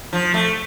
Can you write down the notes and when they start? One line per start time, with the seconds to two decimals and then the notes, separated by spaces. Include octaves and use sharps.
0.13 F3
0.34 A3